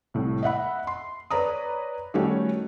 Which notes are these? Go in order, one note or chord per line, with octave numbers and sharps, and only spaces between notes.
C2 A2
D#5 E5 F#5 B5
C6
B4 C#5 D5 A#5 D#6
D#3 G3 A3 C#4 F#4 C#5